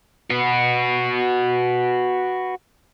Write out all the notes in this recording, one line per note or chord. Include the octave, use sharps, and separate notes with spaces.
F#4 B4